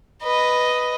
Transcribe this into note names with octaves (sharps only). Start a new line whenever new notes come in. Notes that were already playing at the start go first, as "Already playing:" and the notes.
B4 D#5